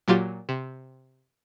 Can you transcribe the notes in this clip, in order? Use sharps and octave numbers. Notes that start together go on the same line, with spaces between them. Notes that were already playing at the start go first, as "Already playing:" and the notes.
A#2 F#3 F4 G4 A6
C3